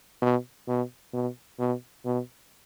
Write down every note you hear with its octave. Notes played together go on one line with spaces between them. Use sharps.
B2
B2
B2
B2
B2